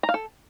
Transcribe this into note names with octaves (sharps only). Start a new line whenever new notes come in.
A#5
F5
A4